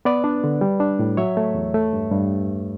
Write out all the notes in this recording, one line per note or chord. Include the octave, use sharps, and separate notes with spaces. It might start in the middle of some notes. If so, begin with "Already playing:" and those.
B3 B4 D5
D4
D3
G3
D4
A2
F#3 C#5 E5
A3
E2
A3
G2
G2